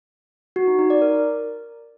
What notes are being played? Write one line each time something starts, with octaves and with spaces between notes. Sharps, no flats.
F#4
D#4
D#4
D5
A#4